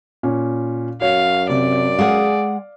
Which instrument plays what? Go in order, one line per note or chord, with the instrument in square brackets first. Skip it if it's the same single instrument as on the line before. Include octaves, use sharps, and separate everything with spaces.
[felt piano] A#2 C#4
[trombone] F#2 [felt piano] F#4 C#5 [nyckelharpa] F5
[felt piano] C3 [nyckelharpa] D5
[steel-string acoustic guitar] G#3 G#4 F#5 [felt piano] F5